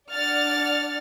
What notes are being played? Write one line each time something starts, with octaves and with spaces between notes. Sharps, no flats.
D4 D5 F#5 F6 A6